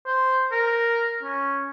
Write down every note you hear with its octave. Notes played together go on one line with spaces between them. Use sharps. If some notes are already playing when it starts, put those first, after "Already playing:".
C5
A#4
C#4